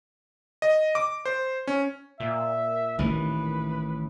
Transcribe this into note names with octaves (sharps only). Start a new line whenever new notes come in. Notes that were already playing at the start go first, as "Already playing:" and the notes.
D#5
D6
C5
C#4
A#2 E5
A1 D#3 E3 B4